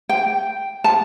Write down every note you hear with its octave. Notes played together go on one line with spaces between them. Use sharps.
G5
A5